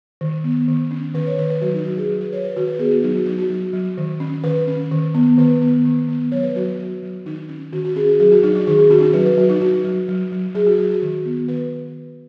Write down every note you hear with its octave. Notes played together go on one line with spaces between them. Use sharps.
D#3
B3
D#3
C#4
D#3 B4
C#5
D#3 B4
B4
F#3 F#4
D#4
F#3 F#4
G#4
F#3
B4
F#3 C#5
B4
D#3 F#4
B4
B3 G#4
F#4
F#3 D#4
F#4
F#3 D#4
F#4
F#3
F#3
D#3
C#4
D#3 B4
C#4
D#3
B3
D#3 B4
B3
D#3
B3
F#3 C#5
B4
F#3 F#4
F#3
F#3
D#3 D#4
C#4
D#3 F#4
F#4
C#4 G#4
G#4
F#3 G#4
F#4
F#3 D#4
D#4
D#3 G#4
G#4
C#4 F#4
D#4
F#4
F#3 B4
B4
F#3 F#4
D#4
F#3 F#4
F#3
F#3
F#3
F#3 G#4
F#4
F#3 F#4
F#4
D#3
B3
D#3 B4